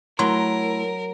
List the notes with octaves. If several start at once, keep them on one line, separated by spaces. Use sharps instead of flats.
F#3 A3 E4 A#4 C6